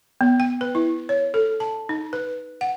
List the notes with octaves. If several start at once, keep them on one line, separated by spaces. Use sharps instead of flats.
B3
G5
B4
E4
C#5
A4
A5
D#4
B4
F#5